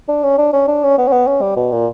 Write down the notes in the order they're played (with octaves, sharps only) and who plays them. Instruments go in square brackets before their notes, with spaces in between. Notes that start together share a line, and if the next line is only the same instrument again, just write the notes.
[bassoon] D4
C#4
D4
C#4
D4
C#4
B3
C#4
B3
C#4
G3
B2
A#2